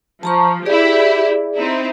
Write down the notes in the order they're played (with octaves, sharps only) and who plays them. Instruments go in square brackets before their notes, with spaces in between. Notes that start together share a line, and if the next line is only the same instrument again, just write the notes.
[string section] F3 [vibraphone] A5 A#5 C#6
[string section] E4 G4 [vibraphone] G#4 D5
[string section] C4 D#4 E4